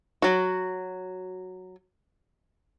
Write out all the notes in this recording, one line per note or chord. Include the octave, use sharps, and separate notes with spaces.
F#3 F#4